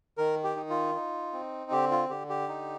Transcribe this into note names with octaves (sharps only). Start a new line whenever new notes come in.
D#3 A#4
G4
D#4
F4
D#4
C4
D3 G4
F4
D3 G4
G4
D#4